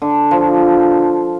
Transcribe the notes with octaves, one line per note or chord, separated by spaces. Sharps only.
D3
F3